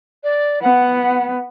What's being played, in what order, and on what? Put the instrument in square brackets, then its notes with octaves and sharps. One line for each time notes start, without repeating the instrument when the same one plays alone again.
[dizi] D5
[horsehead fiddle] B3 [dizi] F#5